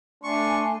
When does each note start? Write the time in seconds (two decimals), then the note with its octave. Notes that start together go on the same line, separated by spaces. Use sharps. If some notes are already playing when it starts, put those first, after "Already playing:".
0.24 A3 D4 G#5 C6 C#6